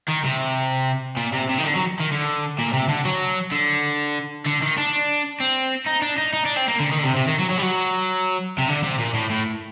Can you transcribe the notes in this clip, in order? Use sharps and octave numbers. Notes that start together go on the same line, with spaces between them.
D#3
C3
A#2
C3
C3
D#3
D3
F#3
D#3
D3
A#2
C3
D3
F#3
D3
D3
D#3
D4
C4
D#4
D4
D#4
D#4
D4
C4
A#3
D3
D#3
D3
C3
C3
D#3
F#3
F#3
G3
F#3
C3
D3
C3
A#2
A2
A2